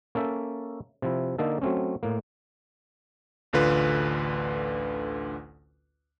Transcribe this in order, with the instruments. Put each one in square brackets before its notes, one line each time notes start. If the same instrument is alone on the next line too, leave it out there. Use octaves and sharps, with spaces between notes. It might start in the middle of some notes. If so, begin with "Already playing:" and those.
[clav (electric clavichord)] A#3 C#4 A4 E5
C3 F3 E4
D3 A#3 D#4 A4
F#3 A3 C4 C#4
A2 A#3
[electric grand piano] A1 D2 D3 F4 B4